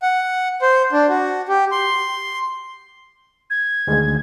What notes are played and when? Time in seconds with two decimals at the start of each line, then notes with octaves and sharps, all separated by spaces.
0.02 F#5
0.62 C5
0.92 D4
1.09 F#4
1.48 G4
1.72 C6
3.50 G#6
3.87 D2 D#3 G#3